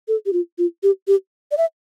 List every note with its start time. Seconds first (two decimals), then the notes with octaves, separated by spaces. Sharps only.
0.08 A4
0.26 G4
0.33 F4
0.58 F4
0.83 G4
1.08 G4
1.51 D5
1.58 E5